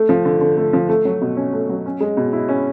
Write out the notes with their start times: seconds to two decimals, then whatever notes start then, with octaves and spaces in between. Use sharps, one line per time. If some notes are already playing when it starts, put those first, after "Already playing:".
Already playing: A3
0.09 F3
0.25 D3
0.41 D3
0.57 A3
0.73 F3
0.89 A3
1.05 F#3
1.21 B2
1.37 C#4
1.53 A3
1.69 F#3
1.86 C#4
2.00 G#3
2.17 B2
2.33 E4
2.49 C#4